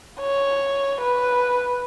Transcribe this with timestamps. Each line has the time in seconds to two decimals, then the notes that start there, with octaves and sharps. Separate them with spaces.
0.21 C#5
1.01 B4